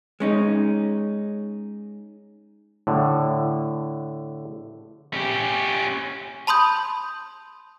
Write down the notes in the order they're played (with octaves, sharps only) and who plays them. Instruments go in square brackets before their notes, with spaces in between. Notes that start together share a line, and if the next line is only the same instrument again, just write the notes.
[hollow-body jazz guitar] G#3 C#4 D#4
[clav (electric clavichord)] A2 D3
[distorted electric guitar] C#4 G4
[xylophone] A5 B5 C6 D#6 G6